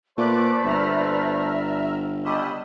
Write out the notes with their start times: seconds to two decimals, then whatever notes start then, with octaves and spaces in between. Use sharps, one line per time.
0.18 A#2 A3 B4 C5 D5 D6 F#6 D7
0.64 G1 E5 A#5 F6
2.24 C#2 G3 D#5 B5 E6